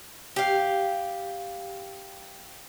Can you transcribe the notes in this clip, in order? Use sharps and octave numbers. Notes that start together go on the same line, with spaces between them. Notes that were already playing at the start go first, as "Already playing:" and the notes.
G4 F5